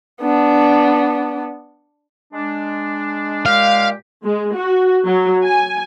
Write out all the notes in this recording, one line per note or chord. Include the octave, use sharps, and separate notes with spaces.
B3 D4
G#3 D4
A#2 G#3 G4 F5
G#3
F#4
F#3
G#5